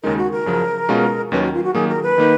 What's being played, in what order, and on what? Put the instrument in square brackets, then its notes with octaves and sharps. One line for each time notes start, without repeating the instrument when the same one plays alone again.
[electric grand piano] D#2 C#3 G#3 D#4 [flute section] A#4
[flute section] F#4
A#4
[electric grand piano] F#2 C#3 F3
B2 G#3 C#4 F4
[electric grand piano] D#2 D#3 F#3 C#4 [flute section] B4
[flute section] F#4
F4
F#4
[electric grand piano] D#3 F#3 A#3 [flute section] G#4
[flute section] A#4
B4
[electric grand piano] D#3 A#3 D#4